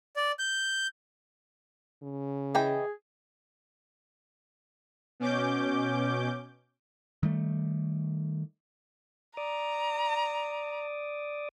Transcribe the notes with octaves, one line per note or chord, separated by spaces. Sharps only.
D5
G6
C#3
E3 G#4 D#5 G5
B2 C#4 D6 G6
D#3 G3 A3
D5 A#5 D6 D#6